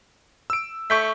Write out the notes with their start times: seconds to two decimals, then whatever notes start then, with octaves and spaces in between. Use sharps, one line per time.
0.50 E6 D7
0.90 A3 C#6 G6 B6